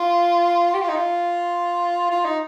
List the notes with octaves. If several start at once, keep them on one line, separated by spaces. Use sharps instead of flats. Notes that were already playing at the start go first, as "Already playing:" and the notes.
Already playing: F4
G4
F4
D#4
F4
F4
D#4